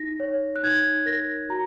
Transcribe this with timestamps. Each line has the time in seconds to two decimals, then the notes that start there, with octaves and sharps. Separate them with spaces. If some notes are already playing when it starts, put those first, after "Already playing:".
Already playing: D#4 A#6
0.20 C#5
0.56 F#6
0.63 D#4 G#6
1.06 A#4 A#6
1.49 F#4 A#5